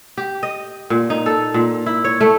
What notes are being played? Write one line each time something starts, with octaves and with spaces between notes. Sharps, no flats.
G4
D#5
A#2
D#4
A4
A#2
E4
C#5
A3